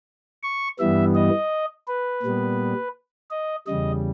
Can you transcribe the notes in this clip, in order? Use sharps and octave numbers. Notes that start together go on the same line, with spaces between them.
C#6
G2 E3 G3 B3 E5
D#5
B4
A#2 G3 B3
D#5
E2 C#3 G3 D#5